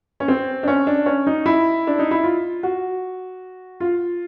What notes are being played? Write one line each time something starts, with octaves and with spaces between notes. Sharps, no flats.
C#4
C4
D4
C#4
D4
C#4
D#4
E4
D4
D#4
E4
F4
F#4
F4